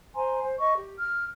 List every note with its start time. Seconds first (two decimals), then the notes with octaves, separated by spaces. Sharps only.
0.15 C5 G#5 A#5 C6
0.42 C5
0.60 D#5 C#6
0.76 G4
0.98 F6